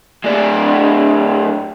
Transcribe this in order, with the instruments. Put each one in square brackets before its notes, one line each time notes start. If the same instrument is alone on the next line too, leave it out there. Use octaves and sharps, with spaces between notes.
[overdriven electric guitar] A2 D4